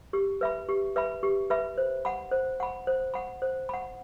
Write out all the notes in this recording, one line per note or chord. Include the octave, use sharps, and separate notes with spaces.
G4
B4 E5 B5
G4
B4 E5 B5
G4
B4 E5 B5
C5
F#5 B5
C5
F#5 B5
C5
F#5 B5
C5
F#5 B5